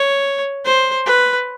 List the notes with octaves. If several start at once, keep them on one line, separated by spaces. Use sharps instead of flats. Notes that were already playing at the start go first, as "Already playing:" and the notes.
Already playing: C#5
C5
B4